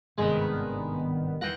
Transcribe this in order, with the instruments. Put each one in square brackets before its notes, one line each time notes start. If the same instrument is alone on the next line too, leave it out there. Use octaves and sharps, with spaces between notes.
[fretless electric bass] G#1 C3 [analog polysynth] G2 D#3 B3 [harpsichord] G#3
[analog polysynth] E2 E3 A#6 [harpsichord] F#5 G5